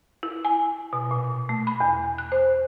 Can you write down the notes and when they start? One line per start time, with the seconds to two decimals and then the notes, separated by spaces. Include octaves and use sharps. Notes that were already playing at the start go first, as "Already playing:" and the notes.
0.23 E4
0.45 G#5
0.93 B2
1.11 A#2
1.49 A3
1.67 B5
1.80 E2
2.18 F#6
2.32 C5